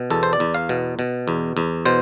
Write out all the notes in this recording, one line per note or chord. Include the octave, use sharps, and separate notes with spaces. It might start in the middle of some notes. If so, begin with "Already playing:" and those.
Already playing: B2
E2 A4
C5
D5
E2
F5
B2
B2
E2
E2
B2 C5